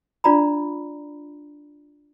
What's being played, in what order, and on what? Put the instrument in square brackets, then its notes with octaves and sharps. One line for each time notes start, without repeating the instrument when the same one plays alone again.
[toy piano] D4 F4 D5 A#5 B5